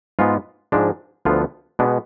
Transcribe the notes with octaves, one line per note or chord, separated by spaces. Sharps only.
G#2 G#3 B3 F4
G#2 F3 G#3 D4
D2 D3 F3 B3 F4
B2 G#3 B3 D4